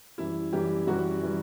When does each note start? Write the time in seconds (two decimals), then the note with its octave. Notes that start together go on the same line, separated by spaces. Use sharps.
0.18 F#2 E3 G3 E4
0.52 F#2 E3 G3 G4
0.87 F#2 E3 G3 F#4
1.23 E3 G3